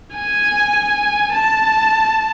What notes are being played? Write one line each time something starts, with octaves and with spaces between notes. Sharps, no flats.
G#5
A5